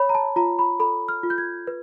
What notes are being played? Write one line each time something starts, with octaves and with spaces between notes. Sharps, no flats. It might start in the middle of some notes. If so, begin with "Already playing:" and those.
Already playing: C#5 B5
A#5
A5
F4 A#5
B5
A4 B5
F6
F4
G6
G#6
B4